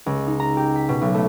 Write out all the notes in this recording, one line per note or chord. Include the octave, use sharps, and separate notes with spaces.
C#2
D#4
A#5
G4
B6
B2
B1
A3